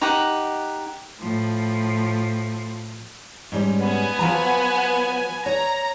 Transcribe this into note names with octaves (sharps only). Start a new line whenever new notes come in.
D#4 G4 F#5
A2 F3
G#2 G3 C#4
B3 G#5
F3 F#3 A#5
C#5 A#5